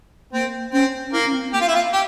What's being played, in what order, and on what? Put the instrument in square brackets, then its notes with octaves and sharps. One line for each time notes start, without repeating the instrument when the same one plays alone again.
[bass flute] A#3 [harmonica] C4
[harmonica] C4 [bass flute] C#4
[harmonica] A#3 [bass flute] E4
[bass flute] C#4
C4
[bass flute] A#3 [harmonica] G4
[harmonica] F4
E4
F4
G4